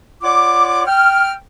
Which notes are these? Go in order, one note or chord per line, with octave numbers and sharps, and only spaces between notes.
F4 C#5 D5 F#5 D6
G5 F6